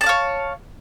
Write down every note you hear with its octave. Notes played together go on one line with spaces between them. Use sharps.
C#5 D5 F5 A5